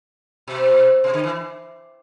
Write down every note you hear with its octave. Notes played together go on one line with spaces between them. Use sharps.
B2
C3
D3
E3